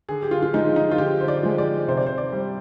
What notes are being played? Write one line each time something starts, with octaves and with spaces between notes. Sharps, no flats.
D3 G#4
G4
F4
F4
F3 G#3 D#4
D#4
F4
D3 G4
C5
D5
F3 G#3
D5
C3 C5
D5
C5
D5
G3